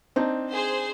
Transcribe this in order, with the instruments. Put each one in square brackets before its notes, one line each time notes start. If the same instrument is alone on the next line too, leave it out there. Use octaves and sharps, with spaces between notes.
[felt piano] C4 D4 D#4
[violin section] G#4 C5